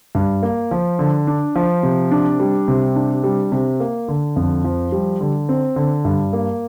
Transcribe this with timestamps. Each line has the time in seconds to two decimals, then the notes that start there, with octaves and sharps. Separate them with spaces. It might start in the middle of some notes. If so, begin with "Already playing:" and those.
0.15 G2
0.43 A#3
0.71 F3
0.99 D3
1.27 D4
1.56 F3
1.83 C3
2.11 D4
2.40 G3
2.68 C3
2.96 D4
3.24 G3
3.52 C3
3.80 A#3
4.08 D3
4.36 F2
4.64 F3
4.92 G3
5.21 D3
5.49 C4
5.76 D3
6.05 G2
6.33 A#3